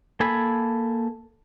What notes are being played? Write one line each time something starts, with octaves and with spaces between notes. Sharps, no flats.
A#3 A4 G#5 B5